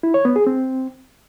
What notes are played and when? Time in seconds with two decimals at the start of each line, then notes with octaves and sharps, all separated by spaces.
0.03 E4
0.14 C#5
0.25 B3
0.36 G#4
0.47 C4